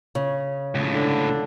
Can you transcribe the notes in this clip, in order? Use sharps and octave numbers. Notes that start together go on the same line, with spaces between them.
C#3
C#2 A2
D3 D4